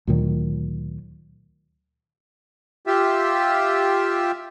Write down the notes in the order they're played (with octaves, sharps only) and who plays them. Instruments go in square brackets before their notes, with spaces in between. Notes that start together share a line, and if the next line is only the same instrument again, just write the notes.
[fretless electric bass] D2 A#2 D#3 F#3
[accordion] F4 G4 E5